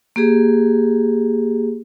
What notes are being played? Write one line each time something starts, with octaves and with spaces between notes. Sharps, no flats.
A#3 G4 G#4